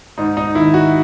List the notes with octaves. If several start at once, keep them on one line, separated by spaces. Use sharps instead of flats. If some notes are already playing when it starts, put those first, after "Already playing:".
G#2 D#4
D#4
D#3 E4
F#4